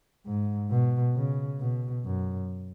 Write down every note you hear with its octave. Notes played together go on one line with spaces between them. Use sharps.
G#2
B2
C#3
B2
F#2